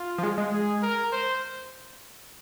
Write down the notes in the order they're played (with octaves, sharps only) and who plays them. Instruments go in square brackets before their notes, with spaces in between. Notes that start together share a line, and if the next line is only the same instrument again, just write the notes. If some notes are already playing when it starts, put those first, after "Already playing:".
Already playing: [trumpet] F4
[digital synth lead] F3
G#3
G#3
[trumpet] G#4
A#4
C5